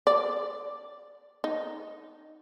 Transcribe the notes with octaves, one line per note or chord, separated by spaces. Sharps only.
D5
D#4